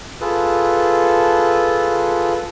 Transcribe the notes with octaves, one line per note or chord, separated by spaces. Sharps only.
F4 G#4 A4 B4